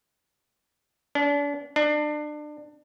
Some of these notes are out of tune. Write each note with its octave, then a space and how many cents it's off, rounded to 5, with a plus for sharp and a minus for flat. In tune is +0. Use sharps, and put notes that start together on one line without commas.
D4 -35
D4 +30